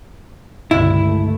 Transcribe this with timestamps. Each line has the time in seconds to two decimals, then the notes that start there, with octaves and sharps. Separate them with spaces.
0.71 C#2 G2 A#2 D3 E4
1.05 A3